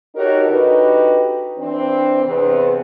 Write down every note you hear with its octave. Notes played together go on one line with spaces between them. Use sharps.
D#4 F#4 G4 A4 A#4 C#5
D3 D#4 F#4 G4 B4
E3 C4 D4
E2 C3 B4